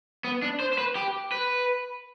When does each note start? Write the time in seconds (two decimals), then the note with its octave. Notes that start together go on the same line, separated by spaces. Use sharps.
0.24 B3
0.42 D4
0.60 C5
0.73 C5
0.78 B4
0.95 G4
1.32 B4